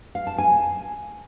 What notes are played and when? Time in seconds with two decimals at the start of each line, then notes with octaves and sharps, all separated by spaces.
0.15 F5
0.27 A5
0.38 G#5